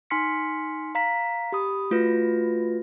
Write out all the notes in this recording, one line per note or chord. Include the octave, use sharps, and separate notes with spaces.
D#4 G#5 C6 F6 B6 C#7
F5 A#5 B6
G4 B5 D#6
A3 F4 F#4 B4 A#6